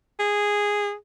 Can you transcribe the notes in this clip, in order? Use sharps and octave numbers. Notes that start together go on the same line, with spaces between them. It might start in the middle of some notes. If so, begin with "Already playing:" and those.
G#4